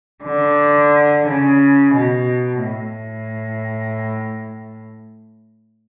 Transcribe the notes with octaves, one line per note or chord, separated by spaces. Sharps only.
D3
C#3
B2
A2